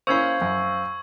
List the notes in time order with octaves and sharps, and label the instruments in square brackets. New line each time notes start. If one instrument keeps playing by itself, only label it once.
[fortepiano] A#3 C#4 E4 [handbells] C5 F5 [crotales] C#6 E6 G#6
[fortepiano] F#2